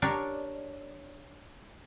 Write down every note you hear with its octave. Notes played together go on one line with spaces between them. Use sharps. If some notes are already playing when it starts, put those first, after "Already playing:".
D4 G4 A#4 C#5 D5